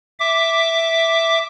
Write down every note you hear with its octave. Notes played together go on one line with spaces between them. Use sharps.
E5 D6